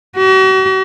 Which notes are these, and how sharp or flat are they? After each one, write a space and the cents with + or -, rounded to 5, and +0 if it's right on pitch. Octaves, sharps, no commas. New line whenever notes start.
F#4 +40